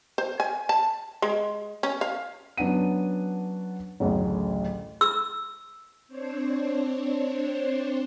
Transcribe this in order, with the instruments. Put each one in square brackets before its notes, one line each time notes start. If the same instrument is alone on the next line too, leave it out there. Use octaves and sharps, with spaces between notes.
[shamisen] C5
G#5
A5
G#3
C#4
F5
[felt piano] F#3 B3 C#4 D4 F#5 D#7
A1 D2 A2 C#3 F#3
[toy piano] E6
[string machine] C4 D4 C5 C#5